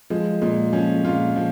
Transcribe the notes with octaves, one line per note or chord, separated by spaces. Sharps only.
F3 G#3
A#2 G#3
F3 C#4
A#2 F4
F3